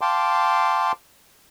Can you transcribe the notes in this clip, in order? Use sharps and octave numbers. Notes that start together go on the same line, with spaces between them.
F5 G5 A5 C6 D6